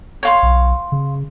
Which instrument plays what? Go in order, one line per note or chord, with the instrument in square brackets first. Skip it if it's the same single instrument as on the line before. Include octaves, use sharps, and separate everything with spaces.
[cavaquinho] C#5 F5 C6
[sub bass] B1
C#3